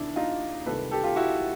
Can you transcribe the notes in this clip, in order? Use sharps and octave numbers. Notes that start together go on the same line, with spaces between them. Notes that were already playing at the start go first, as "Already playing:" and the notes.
Already playing: E2 C3 D#3 D4 E4
D#4 F4
C#2 C3 D#3 G3 A4 B4
G4 A4
F4 G4
E4 F#4